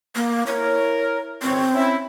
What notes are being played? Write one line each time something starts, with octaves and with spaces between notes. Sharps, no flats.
A#3
E4 A#4 C#5
G#1 C#2 C4 C#5
C#4 E4